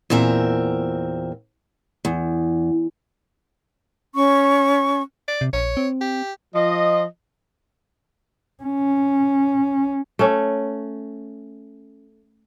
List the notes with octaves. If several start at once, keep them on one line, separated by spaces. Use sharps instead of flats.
E2 A#2 C4 A#4 E5
E2
C#4 C#6
D5
C3
A#1 C#5
C4
G4
F3 D#5
C#4
A3 C#4